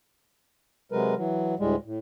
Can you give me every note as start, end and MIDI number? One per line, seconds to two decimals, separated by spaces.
0.92 1.15 48
0.92 1.15 54
0.92 1.15 56
0.92 1.15 70
0.92 1.15 71
1.17 1.55 52
1.17 1.55 54
1.59 1.76 38
1.59 1.76 45
1.59 1.76 55
1.59 1.76 56
1.85 1.99 45